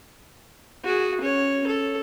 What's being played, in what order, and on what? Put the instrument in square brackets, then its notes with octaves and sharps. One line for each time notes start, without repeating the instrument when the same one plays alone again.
[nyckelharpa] F#4 G#4
C#4 C#5
A4